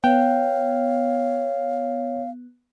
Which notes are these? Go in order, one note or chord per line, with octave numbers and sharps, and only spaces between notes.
B3 C#5 F5 G5